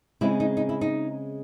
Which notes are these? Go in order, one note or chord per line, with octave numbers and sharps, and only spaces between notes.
C#3 G#3 C4 E4
D#4
D#4
E4
D#4